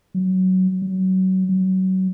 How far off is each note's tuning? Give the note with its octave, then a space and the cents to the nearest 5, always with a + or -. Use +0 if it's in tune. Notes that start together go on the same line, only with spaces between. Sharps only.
F#3 +10
F#3 +25
F#3 +25